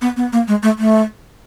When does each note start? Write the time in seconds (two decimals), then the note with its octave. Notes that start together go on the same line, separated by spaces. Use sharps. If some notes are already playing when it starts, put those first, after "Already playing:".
0.02 B3
0.17 B3
0.33 A#3
0.48 G#3
0.63 A3
0.78 A3